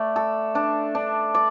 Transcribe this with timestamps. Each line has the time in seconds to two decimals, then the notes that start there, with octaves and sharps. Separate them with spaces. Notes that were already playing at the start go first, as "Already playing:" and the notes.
Already playing: A3 D5
0.16 A4
0.55 D4
0.95 D4
1.34 D5